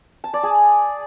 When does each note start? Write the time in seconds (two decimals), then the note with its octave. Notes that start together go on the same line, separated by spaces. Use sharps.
0.24 A5
0.34 D5
0.43 G#4